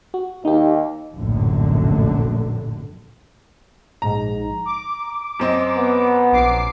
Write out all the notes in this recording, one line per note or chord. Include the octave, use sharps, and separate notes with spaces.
F#4
D#2 D#4 G4
F1 A#1 F#2 A2 D3
A#1 G#2 A#5
D6
F#2 C4 D#5
B3
A#1 D6 C7